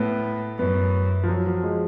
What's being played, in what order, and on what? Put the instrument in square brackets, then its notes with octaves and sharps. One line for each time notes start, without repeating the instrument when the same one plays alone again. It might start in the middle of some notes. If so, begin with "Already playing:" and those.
Already playing: [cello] A2 [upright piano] B3
[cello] F#2 [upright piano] B3
[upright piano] F3
F#3
F3
G#3